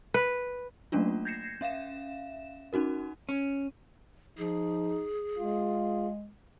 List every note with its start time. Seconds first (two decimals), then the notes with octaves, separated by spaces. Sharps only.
0.14 B4
0.92 F#3 A3 A#3 C#4 D4 F4
1.25 G6 G#6 A#6 C7 C#7 E7
1.61 C#4 E5 F5 E7
2.73 C#4 D#4 F#4 A#4
3.29 C#4
4.38 F3 D#4 G#4
5.38 G#3 F4